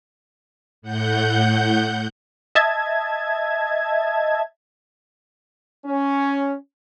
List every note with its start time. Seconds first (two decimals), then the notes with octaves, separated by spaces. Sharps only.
0.82 A2 F#5 G6
2.55 D#5 E5 A5 G#6
5.86 C#4